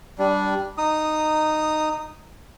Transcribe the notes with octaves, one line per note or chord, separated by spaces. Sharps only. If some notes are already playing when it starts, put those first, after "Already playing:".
G3 D4
D#4 D#6